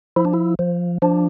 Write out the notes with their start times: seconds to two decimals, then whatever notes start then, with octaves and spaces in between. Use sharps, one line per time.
0.16 F3 E4
0.25 D4
0.33 E4
0.59 F3
1.02 F3 D4